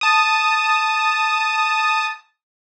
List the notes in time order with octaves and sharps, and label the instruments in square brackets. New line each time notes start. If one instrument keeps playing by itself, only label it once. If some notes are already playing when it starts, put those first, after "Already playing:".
[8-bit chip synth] A5 D#6